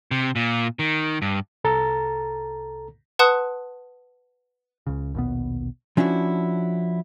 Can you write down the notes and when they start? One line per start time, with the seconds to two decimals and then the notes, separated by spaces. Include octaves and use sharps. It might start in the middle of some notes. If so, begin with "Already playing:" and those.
0.11 C3
0.36 A#2
0.79 D#3
1.22 G2
1.64 C2 A4 A#5 A6
3.19 B4 F#5 A5 C6 D#6 F#6
4.87 C#2 C#3
5.14 A#1 D#2 B2 B3
5.97 F3 C#4 D4 E4 F#4